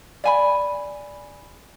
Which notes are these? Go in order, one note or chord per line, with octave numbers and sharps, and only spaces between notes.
D5 G#5 B5